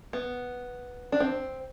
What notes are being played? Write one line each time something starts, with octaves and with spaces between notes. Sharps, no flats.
B3
D4
C4